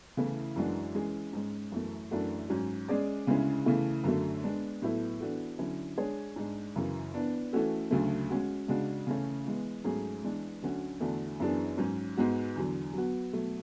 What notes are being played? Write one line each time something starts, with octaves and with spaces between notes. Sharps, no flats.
C#3 E3 A3 E4
F#2 E3 G#3 D4 F#4
E3 G#3 C#4 G#4
G#2 G#3 C#4
F#2 E3 A3
F#2 E3 A3 D4 F#4
G#2 F#3 C#4
G#3 C#4 G#4 D5
D2 C#3 G#3 C#4 E4
C#3 E3 A3 E4
F#2 D3 F#3 A3
G#3 B3 D4
A2 F#3 B3 E4 A4
E3 B3 D4 F#4 A4
D3 F#3 C#4 E4
G#3 D4 G#4 C#5
G#2 G#3 D4
F#2 C#3 E3
E3 B3 D4
E3 A3 C#4 F#4 A4
D2 C#3 F#3 A3
G#3 C#4 F#4
C#3 G#3 D4 F#4
C#3 E3 A3 C#4
E3 G#3 B3
G#2 F#3 A3 C#4 G#4
E3 G#3 B3 D4
D2 D3 F#3 C#4 F#4
E2 D3 A3 D4 F#4
F#2 E3 B3 D4 G#4
G#2 F#3 C#4
G#2 G#3 B3 F#4
E2 D3 F#3
F#3 B3 F#4
B2 F#3 A3